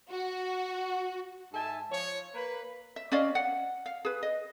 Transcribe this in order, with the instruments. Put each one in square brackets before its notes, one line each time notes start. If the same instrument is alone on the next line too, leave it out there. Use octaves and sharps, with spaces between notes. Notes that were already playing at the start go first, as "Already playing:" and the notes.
[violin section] F#4
[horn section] G#2 E5 G#5 A5
F3 C#5
A#3 B4
[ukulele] E5
C#4 D5 D#5 F5
F#5
F5
G#4 B4
D#5